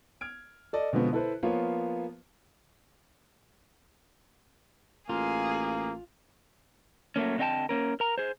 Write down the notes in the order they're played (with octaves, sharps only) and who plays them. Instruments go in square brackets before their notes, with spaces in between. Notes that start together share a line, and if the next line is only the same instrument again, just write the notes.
[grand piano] F6 G#6 D7
A4 D5 D#5
B2 D3 F3 G#3 B3 C4
E4 A4 B4 C5
F3 A#3 B3 F4 C#5
[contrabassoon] A1 [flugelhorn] A#3 [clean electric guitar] F4 [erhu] G#4
[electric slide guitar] F#3 A3 A#3 C#4
D3 C4 D#5 E5 G5 A5
A#3 C#4 A#4
A#4 A#5
G#4 C5